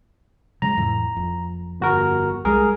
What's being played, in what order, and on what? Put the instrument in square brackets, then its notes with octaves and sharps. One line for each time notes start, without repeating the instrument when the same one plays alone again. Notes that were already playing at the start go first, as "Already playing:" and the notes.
[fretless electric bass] C#3 F#3 G#3 [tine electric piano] A#5
[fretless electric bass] F2 A2 E3
F#1 F2
[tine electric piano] G1 F#4 A#4
[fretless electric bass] C2 G3 G#3 [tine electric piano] G#4 A#4